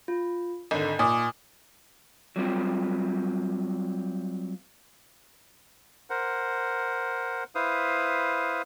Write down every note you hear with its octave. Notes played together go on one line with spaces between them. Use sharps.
F4
G#1 D3 D#5
A#2 G#5 D6 D#6
F#3 G3 C4 F4
A#4 C5 F#5
E4 B4 C5 F5 D#6